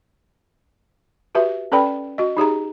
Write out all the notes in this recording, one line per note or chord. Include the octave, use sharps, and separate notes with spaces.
F#4 G4 B4 E5
C#4 A4 B4 D5 G5 B5
F#4 D#5
D#4 G4 G#4 A#5